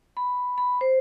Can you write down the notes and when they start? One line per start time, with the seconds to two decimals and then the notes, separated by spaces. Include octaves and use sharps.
0.17 B5
0.58 B5
0.81 C5